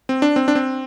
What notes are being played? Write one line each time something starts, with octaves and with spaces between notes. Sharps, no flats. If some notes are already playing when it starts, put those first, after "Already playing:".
C4
D4
C4
D4
C4